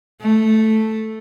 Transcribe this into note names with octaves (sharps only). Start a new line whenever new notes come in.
A3